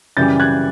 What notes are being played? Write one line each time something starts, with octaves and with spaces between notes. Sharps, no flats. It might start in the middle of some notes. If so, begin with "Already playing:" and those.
F#2 C#3 E3 G3 G6 A6
F#6 G#6